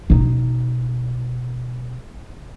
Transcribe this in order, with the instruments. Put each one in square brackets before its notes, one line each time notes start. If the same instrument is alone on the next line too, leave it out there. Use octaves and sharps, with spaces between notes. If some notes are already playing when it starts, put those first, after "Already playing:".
[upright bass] B2 D#4